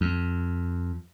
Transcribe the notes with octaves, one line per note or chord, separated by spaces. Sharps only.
F2